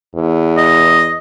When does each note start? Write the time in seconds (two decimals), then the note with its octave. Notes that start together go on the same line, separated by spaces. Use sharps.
0.15 E2
0.57 D#5